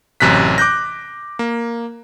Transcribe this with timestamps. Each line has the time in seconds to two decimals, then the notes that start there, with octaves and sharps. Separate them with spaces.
0.20 A1 F#2 C3 F#6 B6
0.58 D6 F#6 G6 A#6
1.39 A#3